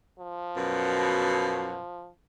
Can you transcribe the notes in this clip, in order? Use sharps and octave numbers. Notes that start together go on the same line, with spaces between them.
F3
F#2 B2